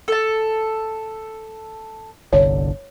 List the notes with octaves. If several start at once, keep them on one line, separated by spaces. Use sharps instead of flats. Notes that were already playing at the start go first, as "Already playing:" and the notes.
A4 A5
G1 C2 D3 C#5